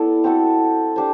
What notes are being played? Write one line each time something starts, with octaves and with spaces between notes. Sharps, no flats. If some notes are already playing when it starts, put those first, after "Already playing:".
Already playing: B3 E4 A4 D5
C4 F#4 A4
D4 G4 C5